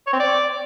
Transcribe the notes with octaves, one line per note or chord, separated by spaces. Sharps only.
C#5
C4
D5